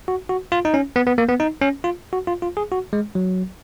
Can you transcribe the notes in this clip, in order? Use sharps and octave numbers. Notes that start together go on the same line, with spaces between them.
F#4
F#4
F4
D#4
C#4
B3
B3
A#3
B3
D#4
C#4
F4
F#4
F4
F4
G#4
F#4
G#3
F#3